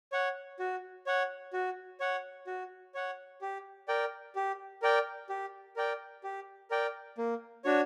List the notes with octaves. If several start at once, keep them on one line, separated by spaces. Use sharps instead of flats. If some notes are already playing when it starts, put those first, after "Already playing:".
C#5 F#5
F#4
C#5 F#5
F#4
C#5 F#5
F#4
C#5 F#5
G4
A#4 D5 G5
G4
A#4 D5 G5
G4
A#4 D5 G5
G4
A#4 D5 G5
A#3
D4 F#4 C#5